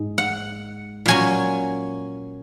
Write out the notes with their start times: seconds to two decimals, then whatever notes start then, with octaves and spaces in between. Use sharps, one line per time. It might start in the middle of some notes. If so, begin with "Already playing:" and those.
Already playing: G#2
0.18 F#5
1.06 A#2 F#3 C#4 G#5